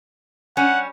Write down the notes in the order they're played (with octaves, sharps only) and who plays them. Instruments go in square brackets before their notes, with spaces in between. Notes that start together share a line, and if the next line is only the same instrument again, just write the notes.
[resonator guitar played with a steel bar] G3 C#4 [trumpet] F#5